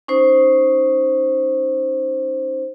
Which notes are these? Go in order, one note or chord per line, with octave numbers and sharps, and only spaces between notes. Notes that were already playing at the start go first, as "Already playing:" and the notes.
C#4 D#4 C5